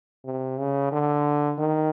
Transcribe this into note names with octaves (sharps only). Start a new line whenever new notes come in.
C3
C#3
D3
D#3